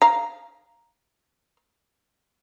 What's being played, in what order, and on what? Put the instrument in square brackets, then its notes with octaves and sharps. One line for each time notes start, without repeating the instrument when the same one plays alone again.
[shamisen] F5 A#5